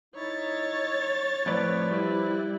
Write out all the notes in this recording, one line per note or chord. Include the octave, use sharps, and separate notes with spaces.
D#4 E4 C#5 A6
F2 A2 F3 B4 D5
G3 E4